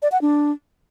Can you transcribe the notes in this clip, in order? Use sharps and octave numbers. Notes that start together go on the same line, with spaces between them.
D5
F#5
D4